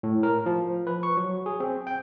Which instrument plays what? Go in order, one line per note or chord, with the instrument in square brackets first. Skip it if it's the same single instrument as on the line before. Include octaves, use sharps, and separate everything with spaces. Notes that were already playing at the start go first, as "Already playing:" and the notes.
[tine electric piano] A2
A#4
F3
B4
C#6
F#3
G#4
C4
G5